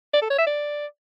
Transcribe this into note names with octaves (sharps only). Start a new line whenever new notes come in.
D5
A4
C#5
E5
D5